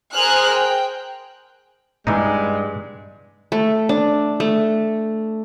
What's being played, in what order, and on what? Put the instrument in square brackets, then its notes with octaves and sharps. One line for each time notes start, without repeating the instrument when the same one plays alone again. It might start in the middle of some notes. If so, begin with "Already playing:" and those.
[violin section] G#4 A#4 C5 G#5 F6 F#6
G5
[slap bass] G2 [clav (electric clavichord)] E3 D4 D#4 [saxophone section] G#3
[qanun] A3
D4
A3